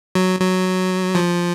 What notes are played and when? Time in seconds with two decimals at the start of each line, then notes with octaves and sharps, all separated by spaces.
0.15 F#3
0.40 F#3
1.15 F3